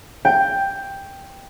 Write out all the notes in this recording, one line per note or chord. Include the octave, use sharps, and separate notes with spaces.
G5